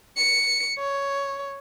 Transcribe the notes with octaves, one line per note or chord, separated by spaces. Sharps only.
C#7
C#5